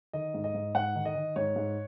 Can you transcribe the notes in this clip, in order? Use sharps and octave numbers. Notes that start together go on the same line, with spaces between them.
D#3 D#5
G#2
D#5
G#2
G#2 F#5
D#3
D#5
D#3
G#2 C#5
G#2